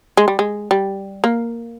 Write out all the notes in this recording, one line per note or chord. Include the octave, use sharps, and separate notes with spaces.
G#3
G3
G#3
G3
A#3